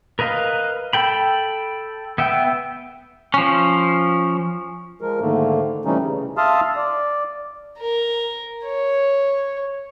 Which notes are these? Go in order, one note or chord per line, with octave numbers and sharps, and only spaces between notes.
A#4 B4 D#5 F5
A4 G5 B5
B3 E5 G5
F3 C#4
F3 G#3 A#4
G#2 D3 D#3 A3 A#3
C3 E3 G3 A3 C#4 D#4
C#3
E5 F5 A5 C6 D#6 F6
D5
A#4
C#5